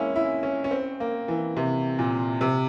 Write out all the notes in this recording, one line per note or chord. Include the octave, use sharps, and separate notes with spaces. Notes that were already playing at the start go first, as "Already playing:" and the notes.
Already playing: G#3 A#3 C#4 E4
E4
C#4
C#4
C4
A#3
E3
C3
A#2
C3